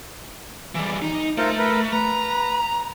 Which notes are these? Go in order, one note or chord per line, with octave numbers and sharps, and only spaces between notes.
E3 G3
D#4
A3 F4 A#4 C5
A#4 B4
B4 A#5